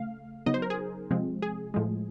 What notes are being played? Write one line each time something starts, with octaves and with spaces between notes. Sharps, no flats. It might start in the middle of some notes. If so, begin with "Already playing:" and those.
Already playing: C#3 A3 F5
C#3 F#3 B3 D#4 D#5
C5
A#4
G#4
C3 F3 G#3 C4
G#4
A2 F3 G#3